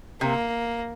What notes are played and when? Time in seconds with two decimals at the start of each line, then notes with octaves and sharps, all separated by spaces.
0.21 C3 A#3